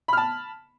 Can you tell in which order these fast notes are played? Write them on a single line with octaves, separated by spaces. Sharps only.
B5 F6 A5